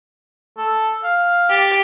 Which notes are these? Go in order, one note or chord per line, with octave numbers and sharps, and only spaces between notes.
A4
F5
G4 A6